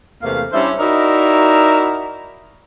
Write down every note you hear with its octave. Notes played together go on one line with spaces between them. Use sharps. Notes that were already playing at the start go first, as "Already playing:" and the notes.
E2 C3 A3 A#3 F5
G3 C#4 D4 E4 C5 E5
D#4 E4 F#4 A#4 D5 E5